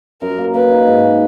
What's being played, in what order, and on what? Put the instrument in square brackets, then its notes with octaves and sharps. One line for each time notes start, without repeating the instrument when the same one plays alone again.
[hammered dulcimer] F#2 [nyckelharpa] A#4
[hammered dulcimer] A#3
[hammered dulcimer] A#3 [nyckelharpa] B4
[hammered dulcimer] D#4
G#2
A#3